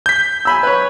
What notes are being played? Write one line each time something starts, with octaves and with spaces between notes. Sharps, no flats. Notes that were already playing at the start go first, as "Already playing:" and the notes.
G6 B6
G#5 B5 E6
B4 C#5